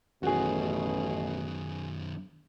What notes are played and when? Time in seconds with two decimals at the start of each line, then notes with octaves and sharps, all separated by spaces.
0.23 A1 F#2 B2 D#3 F#4 G#4